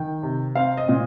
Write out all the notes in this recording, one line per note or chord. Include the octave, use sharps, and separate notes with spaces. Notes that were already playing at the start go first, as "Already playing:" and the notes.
Already playing: D#3 G5
C3
C4 F5
D#5
A#2